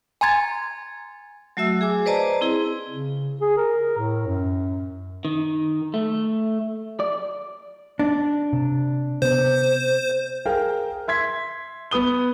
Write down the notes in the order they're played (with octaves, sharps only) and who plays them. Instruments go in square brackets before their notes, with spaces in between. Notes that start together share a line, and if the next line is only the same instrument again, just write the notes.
[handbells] G#5 A#5 C6 G#6 A6
[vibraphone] F#3 A3 F#4 E5 E6
G#4 G#5 D6
B4 C5 D5 D#5 A5 A#5
C4 E4 G#4
[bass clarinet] C#3
G#4
A#4
A2
F#2
[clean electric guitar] D#3
A3
D5
[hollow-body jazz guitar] D4
[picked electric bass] C3
[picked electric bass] C3 B3 [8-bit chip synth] C5
[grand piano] G#4 A#4 F5 G5
E5 C6 G#6 B6
B3 B4 D#6 G7